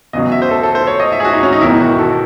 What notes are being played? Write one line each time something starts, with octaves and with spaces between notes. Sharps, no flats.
E2 C#3 F#3 D#5
E5
C5
A4
A4
C5
C#5
D#5
E5
G#4
F#4
D#4
C#4
D#4
E1 E2 D#3 F#3 E4
F#4
A4